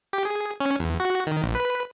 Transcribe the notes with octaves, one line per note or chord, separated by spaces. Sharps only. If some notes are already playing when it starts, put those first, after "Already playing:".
G4
G#4
C#4
E2
F#4
D#3
A#1
B4